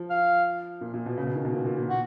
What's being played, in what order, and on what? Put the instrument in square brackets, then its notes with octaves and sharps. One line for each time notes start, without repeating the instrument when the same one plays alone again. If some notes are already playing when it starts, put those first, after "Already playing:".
Already playing: [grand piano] F3
[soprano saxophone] F5
[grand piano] A#2
A#2
B2
C#3
B2
D#3
B2
A#2
A#2
A#2
[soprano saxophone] F#4